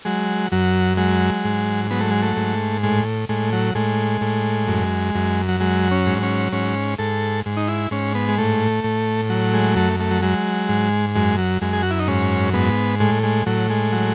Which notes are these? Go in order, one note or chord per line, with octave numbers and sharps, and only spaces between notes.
F#3 G#3
F#2 F#3
F#3 G#3
G#2
F#3 B3
A3
G#3
A3
G#2
A2 G#3
A2 G#3
F#3
A2 G#3
A2
F#2
F#2
F#3
F#3 G#3
C#4
G#2
C#4
G#2 C#4
G#2 A4
G#2
D#4
E4
G#2 C#4
B3
G#3
A2 A3
A2
F#3
G#3
F#2 A3
A3
F#3
F#3 G#3
G#2
F#2 G#3
F#3
F#2 G#3
G#4
F#4
E4
D#4
G#2 C#4
G#2 B3
A2 G#3
G#3
A2 F#3
G#3
F#3